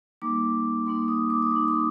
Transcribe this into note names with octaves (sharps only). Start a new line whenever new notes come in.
G3 A#3 D#4 D6
G3 A#3 D#4 C6
D#6
D6
D#6
G3 A#3 D#4 D6
C6